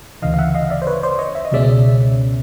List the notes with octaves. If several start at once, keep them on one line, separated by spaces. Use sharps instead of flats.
D2 C#3 E3 D#5 F5
F5
E5 F#5
D#5 F5
D5 E5
C5
B4 C#5
C5 D5
C#5 D#5
E5
D#5
C#2 B2 G#3 C#4 D5 E5